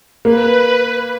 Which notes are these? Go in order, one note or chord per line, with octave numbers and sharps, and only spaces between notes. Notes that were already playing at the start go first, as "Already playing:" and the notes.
A#3 B4